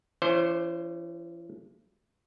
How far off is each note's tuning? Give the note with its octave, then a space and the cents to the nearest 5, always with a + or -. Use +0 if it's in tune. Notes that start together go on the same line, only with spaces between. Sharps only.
E3 +45 C#4 +25 C5 +5